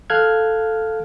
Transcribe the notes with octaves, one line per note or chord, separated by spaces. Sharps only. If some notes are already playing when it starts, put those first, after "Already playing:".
A4 F5 A5 F6 F#6 G#6